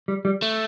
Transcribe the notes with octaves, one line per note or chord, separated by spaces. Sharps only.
G3
G3
A3